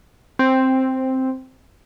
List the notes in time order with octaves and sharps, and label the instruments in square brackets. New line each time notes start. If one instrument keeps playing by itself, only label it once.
[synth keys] C4